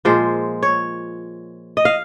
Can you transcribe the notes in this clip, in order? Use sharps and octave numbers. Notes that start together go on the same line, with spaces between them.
A#2 F3 G#3 C5
C#5
D#5
F5